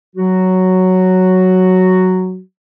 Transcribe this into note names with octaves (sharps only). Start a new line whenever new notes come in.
F#3 F#4